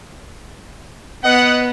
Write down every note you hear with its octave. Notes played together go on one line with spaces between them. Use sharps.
B3 D#5 F#5